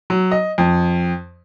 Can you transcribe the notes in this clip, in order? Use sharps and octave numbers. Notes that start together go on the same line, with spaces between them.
F#3
D#5
F2